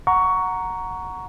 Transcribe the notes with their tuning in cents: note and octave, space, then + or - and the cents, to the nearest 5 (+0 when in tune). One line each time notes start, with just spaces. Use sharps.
F#5 -5 A#5 +0 C#6 +15